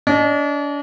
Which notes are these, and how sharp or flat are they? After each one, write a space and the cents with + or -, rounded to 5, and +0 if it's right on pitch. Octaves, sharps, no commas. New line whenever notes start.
D4 -40 D#5 -25